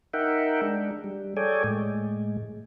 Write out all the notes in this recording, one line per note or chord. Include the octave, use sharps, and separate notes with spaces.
D#4 A#4 E5 F#5 G5
G#3 D4
G3
G#4 A4 C#5 D5 G5 G#5
A2 G#3